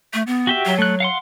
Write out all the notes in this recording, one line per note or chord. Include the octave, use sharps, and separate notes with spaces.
A3
B3
F#4 G4 E5
F#3
A3 F#6
F5 F#5 C6